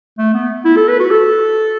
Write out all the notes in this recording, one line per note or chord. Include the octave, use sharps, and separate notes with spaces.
A3
B3
E4
A4
B4
F#4
A4